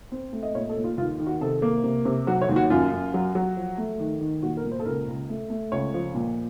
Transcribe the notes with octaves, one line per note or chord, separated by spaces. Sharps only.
C4
A3
D#5
A#2 C#5
A4
A#2
F4
D#2 F4
D#3
F#4
C3 A4
A#3
C3
C3
F#3 F#4
C#5
D#2
F#4
F#2 F4
F#2
F#3
F#3
F3
A3
D#3
D#3
A#2 F#4
A#4
A#2
C5
A4
C#2 A#4
C#2
A3
A3
C#2 C#5
F3
A#2